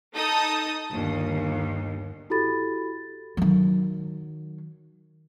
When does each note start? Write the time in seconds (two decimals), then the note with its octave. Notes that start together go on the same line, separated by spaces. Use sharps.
0.14 D#4 A4 A5 D#6
0.92 G1 D#2
2.30 E4 F#4 G4 A4 B5 A6
3.37 D#3 F#3